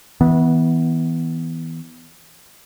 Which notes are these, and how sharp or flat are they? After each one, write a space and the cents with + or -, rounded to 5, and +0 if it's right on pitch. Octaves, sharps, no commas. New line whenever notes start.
E3 -25 B3 +0